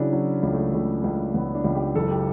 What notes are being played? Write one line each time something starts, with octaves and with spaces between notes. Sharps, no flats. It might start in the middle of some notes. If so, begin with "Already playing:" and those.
Already playing: C#3 F#3 D4 E4
F#3 C#4
C#2
A3
C#2 A3
C#2
C#2 B3
D4
C#2
G4
F#1 A4
G4